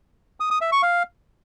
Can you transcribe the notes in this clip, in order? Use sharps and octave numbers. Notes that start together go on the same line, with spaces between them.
D#6
D#6
E5
C#6
F5